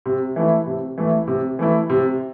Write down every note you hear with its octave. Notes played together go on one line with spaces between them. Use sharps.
C3
E3 A3 E4
C3
E3 A3 E4
C3
E3 A3 E4
C3